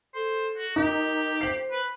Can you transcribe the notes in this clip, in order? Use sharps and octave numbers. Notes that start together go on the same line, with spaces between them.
A4 C5
F#4
D#4 G4 A#4
C5 C7 F#7
B4